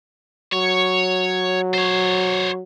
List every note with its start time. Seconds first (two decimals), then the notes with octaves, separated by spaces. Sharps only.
0.53 F#3 C#5
1.74 C5 C#5